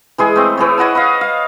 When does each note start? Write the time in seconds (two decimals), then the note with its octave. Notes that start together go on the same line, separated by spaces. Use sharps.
0.18 E3 G#3 G#4
0.36 A3 C4
0.57 E3 G#4 C#5
0.78 C#5 D#5 F#5 A5
0.95 B4 D#5 F5
1.21 F5